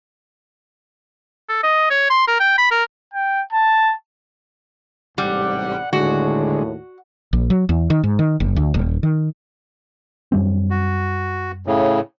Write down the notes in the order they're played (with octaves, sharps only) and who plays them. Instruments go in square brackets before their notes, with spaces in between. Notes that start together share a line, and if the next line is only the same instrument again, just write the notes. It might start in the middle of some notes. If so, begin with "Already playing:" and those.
[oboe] A4
D#5
C#5
C6
A#4
G5
B5
A#4
[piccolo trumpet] G5
A5
[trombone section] A1 G#2 C3 [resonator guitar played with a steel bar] G3 [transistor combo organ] F#5
[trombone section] D#2 A2 [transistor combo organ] D3 G#3 [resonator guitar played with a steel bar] F#4
[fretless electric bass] A#1
F#3
E2
D#3
G#2
D#3
F#1
D2
D#1
D#3
[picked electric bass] F#2 G3 C4
[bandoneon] F#4
A2 C#3